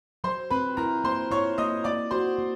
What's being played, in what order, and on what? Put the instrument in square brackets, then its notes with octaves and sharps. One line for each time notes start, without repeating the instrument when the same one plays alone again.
[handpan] F#3 [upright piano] C5 C6
[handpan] C4 [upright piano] B4 B5
[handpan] E4 [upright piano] A#4 A#5
[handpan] A#3 [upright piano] C5 C6
[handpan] E4 [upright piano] C#5 C#6
[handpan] A#3 [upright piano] D#5 D#6
[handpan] A#3 [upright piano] D5 D6
[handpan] F#4 [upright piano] C5 C6
[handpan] A#3